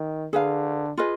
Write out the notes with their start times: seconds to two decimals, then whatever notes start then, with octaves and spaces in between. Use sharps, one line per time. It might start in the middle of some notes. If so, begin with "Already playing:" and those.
Already playing: D#3
0.33 D3 G#4 B4 F5
0.97 F4 G#4 B4 D#5